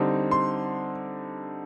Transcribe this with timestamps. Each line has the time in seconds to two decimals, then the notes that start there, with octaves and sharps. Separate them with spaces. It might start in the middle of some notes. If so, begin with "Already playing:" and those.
Already playing: D3 G3 C4 D#4
0.31 C6